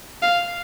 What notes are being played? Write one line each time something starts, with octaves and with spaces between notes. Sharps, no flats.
F5